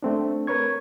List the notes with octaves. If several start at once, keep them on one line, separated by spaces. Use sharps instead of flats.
A3 C4 D4
A#4 B4 C#5 C#6 G#6